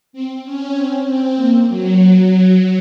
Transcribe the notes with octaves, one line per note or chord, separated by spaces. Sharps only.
C4
C#4
C4
C4
A#3
F#3